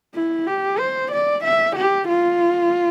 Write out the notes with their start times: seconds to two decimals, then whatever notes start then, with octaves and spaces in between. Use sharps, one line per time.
0.15 E4
0.47 G4
0.79 C5
1.12 D5
1.44 E5
1.76 G4
2.08 F4